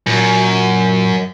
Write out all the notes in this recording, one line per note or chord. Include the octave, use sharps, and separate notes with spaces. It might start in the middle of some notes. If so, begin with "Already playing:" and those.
F#2 A#2